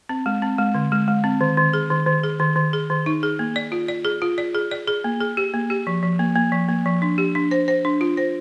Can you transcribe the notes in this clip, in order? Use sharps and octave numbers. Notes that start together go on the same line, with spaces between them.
C4
G#3
C4
G#3
D3
G#3
G#3
C4
D#3
D#3
G#4
D#3
D#3
G#4
D#3
D#3
G#4
D#3
D#4
G#4
A#3
D5
F4
D5
G#4
F4
D5
G#4
D5
G#4
A#3
G#4
G4
A#3
G4
F3
F3
A#3
A#3
F3
A#3
F3
D4
G4
D4
C5
C5
D4
F4
C5